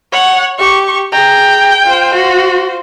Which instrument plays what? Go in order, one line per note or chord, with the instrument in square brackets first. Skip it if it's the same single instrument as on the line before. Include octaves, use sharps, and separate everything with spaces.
[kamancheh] C#5 [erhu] F#5
[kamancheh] G4 [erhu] C#6
[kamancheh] G#4 A#5 [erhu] G5
[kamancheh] F4 C5
[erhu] F#4